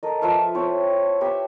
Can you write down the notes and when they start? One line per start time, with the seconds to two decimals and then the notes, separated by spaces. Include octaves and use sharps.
0.03 A4 A#4 D#5
0.22 F3 B4 E5 F5
0.55 C4 E4 C#5 G5
1.21 G4 B4 E5 G5